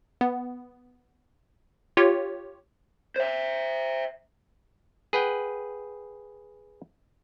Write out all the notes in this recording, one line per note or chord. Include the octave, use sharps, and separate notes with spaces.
B3
F4 G4 C#5
C5 E5
G#4 B4 F#5 G5